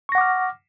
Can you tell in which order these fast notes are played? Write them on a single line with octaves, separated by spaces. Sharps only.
C#6 A#6 F#5 D6 F6